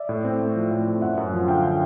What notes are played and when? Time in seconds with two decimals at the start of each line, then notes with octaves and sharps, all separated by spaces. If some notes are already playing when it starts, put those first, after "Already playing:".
Already playing: D5 E5
0.09 A2
0.24 C4
0.40 A3
0.56 F3
0.71 A2
0.86 C4
1.02 F#2 E5 F#5
1.17 F#2
1.33 F3
1.48 D3 F5 G5